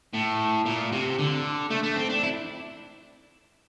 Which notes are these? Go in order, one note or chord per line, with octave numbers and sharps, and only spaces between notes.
A2
A#2
C3
D3
A3
A3
C4
D4
E4